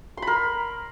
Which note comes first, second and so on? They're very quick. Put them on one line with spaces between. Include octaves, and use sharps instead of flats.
C6 B5 A#4